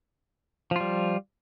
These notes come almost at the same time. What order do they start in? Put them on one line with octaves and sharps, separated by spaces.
F3 F4 G3